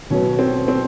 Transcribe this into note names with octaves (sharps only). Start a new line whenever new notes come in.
B2 F#3 B3 C#4
C4
C4